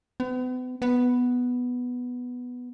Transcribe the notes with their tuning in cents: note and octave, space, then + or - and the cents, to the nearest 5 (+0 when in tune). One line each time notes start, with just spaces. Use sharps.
B3 +40
B3 +0